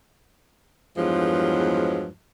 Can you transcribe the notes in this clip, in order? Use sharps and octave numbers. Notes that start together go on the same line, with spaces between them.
E2 G2 F3 F#3 G#3